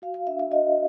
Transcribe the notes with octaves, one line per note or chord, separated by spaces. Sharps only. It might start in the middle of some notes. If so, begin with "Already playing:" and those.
F#4 F5
F5
D4 E5
E5
F#4 D#5